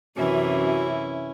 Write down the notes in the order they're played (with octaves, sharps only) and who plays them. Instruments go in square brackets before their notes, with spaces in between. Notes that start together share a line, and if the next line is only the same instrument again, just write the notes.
[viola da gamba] F#2 C3 E3 [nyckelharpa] C#4 E4 [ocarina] F#4